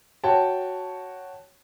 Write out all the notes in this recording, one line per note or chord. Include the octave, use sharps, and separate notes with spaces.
F#4 C#5 G5 A5